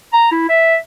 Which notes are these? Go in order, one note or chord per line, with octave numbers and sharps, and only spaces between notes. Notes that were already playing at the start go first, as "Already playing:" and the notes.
A#5
E4
E5